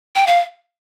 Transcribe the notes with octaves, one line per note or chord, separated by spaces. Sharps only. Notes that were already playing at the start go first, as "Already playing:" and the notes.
G5
F5